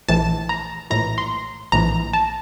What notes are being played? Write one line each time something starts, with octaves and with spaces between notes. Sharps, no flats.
A#1 A2 E3 A5
A#5
A#1 A2 E3 A#5
C6
A#1 A2 E3 A#5
A5